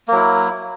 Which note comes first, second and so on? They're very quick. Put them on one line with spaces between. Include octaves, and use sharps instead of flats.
A#3 F#3 E4